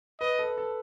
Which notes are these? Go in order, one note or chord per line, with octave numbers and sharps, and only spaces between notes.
B4 D#5
A4
A4